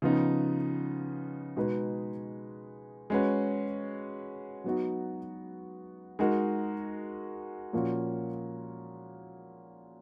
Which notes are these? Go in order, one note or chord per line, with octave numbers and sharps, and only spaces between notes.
C#3 F3 B3 D#4
B2 G#3 D#4 G#4 B4
G#3 C#4 F#4 B4
F#3 B3 D#4 F#4
G#3 D#4 F#4 A#4
A#2 F3 A#3 C#4 F#4